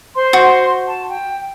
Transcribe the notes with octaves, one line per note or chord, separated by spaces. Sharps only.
C5 C6
F#4
A5
G5